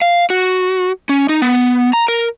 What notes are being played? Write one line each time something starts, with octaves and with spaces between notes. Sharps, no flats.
F5
F#4
C#4
D#4
B3
A#5
A#4